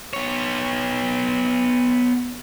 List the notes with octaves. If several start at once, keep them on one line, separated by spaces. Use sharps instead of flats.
B3 C#5